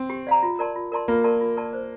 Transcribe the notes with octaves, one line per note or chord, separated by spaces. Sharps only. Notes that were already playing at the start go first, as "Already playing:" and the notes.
Already playing: C4
G4
D5 F5 A#5
F4
A#4 D5 A5 C6
F4
A#4 D5 A5 C6
A#3 F4
A#4 D5 A5 C6
F4
A#4 D5 A5 C6
C5